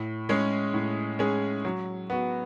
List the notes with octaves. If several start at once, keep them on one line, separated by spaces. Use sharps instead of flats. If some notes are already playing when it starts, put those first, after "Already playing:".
Already playing: A2
G#3 C#4 G#4
A2
G#3 C#4 G#4
F#3
B3 F#4